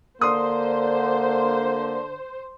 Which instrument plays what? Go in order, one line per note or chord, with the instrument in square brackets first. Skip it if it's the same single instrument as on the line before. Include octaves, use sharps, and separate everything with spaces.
[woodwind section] D3 [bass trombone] A#3 [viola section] C5 [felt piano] C6 D#6